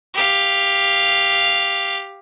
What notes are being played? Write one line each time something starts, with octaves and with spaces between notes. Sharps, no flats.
G4 F5